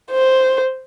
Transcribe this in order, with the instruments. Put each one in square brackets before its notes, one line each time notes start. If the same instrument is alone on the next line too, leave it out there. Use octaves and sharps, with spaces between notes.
[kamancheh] C5